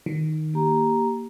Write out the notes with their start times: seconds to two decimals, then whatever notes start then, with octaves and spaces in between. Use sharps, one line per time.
0.06 D#3
0.54 A#3 G4 A#5